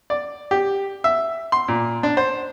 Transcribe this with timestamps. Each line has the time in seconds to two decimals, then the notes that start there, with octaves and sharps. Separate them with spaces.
0.10 D5
0.51 G4
1.04 E5
1.52 C6
1.68 A#2
2.03 D4
2.17 C5